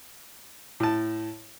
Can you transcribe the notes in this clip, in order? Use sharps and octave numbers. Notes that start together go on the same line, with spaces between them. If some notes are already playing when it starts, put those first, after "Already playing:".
A2 A5